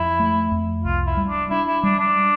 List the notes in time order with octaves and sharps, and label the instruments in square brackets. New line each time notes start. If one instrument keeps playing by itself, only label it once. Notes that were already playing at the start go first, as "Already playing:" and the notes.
Already playing: [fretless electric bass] F2 [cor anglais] E4
[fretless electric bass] A3
F2
[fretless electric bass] C2 [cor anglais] F4
[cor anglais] E4
[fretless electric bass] G3
[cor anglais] D4
[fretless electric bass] D4 [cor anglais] E4
[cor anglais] E4
[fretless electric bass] G3 [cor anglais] D4
[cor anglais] D4